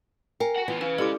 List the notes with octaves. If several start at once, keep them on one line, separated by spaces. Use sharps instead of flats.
A#4 G5 G#5
F#4 F#5
E3 B3 F4
C#4 B4 F5 G#5
G#3 E4 G4 A4 D5 D6